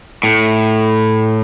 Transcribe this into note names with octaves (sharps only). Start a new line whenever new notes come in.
A2